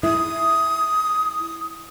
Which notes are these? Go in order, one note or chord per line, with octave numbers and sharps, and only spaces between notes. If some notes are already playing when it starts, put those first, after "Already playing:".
E4 D#6